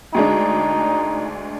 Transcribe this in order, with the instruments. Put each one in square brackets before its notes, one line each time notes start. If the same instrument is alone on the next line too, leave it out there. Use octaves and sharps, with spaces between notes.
[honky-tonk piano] D2 G#3 D4 [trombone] D#4